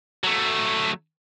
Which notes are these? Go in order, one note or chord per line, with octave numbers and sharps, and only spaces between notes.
F#3 A3